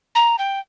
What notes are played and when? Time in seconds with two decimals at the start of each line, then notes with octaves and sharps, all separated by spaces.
0.15 A#5
0.38 G5